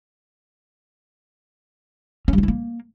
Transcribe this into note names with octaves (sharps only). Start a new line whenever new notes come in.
C#4
G3
F4
E4
A#3